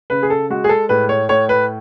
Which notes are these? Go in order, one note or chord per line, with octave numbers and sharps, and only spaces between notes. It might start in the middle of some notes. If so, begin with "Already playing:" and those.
C#3 B4
G#4
A4
G#3 F#4
G#4
A4
A2 B4
C#5
A2 C#5
B4